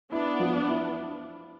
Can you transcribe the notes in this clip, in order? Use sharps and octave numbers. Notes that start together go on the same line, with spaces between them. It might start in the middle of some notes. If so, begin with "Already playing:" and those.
B3 D4 E4
F3
E4